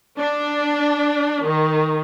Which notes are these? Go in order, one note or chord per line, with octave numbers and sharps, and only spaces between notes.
D4
D#3